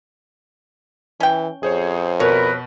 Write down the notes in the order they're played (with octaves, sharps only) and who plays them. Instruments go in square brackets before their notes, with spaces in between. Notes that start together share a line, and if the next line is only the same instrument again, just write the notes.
[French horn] E3 [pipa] C#4 G5
[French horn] F2 [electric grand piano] G#4 C5 C#5
[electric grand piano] B2 [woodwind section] A#4 B4 [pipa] C#5